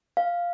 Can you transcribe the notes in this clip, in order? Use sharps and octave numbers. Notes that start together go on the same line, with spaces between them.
F5